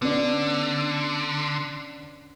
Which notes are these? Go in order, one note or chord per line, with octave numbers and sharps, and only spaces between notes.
D3 B3 C#4 D4